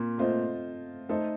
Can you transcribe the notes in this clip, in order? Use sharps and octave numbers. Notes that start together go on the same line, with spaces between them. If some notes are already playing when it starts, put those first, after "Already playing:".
Already playing: A#2 C4
A3 C4 F4 C5 D#5
A3 D#4 A4 C5 D#5